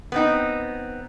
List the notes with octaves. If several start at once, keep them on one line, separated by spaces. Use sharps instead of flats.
B3 C4 D#4